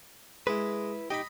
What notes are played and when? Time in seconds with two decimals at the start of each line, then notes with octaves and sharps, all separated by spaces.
0.47 G#3 E4 B4
1.10 D#4 G4 D#5 B5